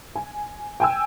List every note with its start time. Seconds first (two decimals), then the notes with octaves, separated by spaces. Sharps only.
0.16 G#5
0.80 G5 G#5 E6